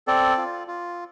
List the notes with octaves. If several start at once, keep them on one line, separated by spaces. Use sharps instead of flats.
C4 A4 D5
F4
F4